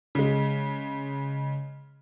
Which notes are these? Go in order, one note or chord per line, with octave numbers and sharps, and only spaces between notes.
C#3 G#3